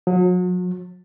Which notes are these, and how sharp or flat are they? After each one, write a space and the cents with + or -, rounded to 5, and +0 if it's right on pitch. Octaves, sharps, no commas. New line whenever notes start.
F#3 -40